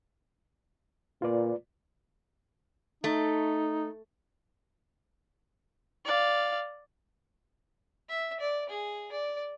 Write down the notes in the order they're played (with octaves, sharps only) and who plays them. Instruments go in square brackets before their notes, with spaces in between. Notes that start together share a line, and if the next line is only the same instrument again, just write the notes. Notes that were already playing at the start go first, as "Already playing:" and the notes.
[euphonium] A#2 [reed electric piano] F4 B4 D5
[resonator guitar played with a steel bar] A3 [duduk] D#4
[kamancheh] D5 F5
[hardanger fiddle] E5
D5
G#4
D5